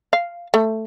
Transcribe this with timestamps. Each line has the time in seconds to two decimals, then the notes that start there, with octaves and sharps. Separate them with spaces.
0.13 F5
0.54 A3